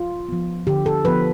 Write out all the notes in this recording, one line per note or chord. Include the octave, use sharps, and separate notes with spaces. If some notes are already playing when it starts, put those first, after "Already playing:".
Already playing: F4
F3 B3
D3 G4
A4
F3 B3 B4